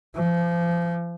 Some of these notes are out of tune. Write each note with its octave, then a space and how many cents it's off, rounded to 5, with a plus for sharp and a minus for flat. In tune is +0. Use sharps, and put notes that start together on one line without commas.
F3 -30